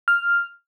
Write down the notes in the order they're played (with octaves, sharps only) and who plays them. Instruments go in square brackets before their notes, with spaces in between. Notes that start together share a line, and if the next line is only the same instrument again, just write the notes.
[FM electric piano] F6